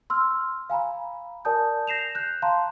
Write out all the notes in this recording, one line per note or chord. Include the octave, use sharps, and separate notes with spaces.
C6 E6 F6
F5 G#5 A#5 B5
A#4 D5 G#5 A5 D#6 G6
G6 A#6 C7 E7 F7
F#6 G6
F5 A5 A#5 C6